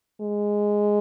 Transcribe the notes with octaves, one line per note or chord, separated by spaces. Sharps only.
G#3